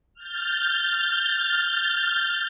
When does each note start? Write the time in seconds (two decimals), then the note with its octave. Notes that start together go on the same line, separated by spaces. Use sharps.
0.14 F6 G6 A6